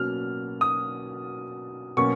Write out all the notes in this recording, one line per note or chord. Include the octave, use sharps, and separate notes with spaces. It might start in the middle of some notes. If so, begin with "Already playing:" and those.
Already playing: B2 F#3 A#3 C#4 F6
D#6
B2 F#3 A#3 C#4 C#6